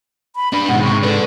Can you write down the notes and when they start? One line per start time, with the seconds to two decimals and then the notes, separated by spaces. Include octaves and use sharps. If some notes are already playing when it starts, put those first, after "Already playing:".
0.36 B5
0.53 D4 B4 B5
0.69 G#2 B2 D#3 F#5
0.83 C3 C#6
1.03 A4 B4 D5